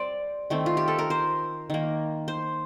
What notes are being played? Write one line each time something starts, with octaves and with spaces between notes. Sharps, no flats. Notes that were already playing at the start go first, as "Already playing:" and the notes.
Already playing: G3 C4 C5 D5
D#3 A3 C4
F4
G4
A4
A#4
C5
D#3 A#3
C5